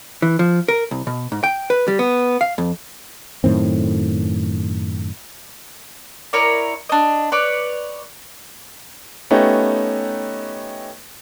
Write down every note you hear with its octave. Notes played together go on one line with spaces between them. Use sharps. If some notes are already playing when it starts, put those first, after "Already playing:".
E3
F3
A#4
C2
B2
G#2
G5
B4
G3
B3
F5
F2
F#2 A2 D#3 C4
E4 A#4 C#5 D5
D4 D#5
B4 C#5 D5
A3 B3 C#4 D#4 G4